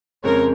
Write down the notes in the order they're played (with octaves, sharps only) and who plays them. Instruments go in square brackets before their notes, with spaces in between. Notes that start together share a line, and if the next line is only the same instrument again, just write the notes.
[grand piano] F2 C#3 G#3 C4 [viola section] A#4 C#5